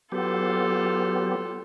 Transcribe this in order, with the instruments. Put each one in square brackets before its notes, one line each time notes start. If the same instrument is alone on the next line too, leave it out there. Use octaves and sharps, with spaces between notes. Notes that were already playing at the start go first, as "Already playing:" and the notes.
[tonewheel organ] F#3 B3 G4 [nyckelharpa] F4 A4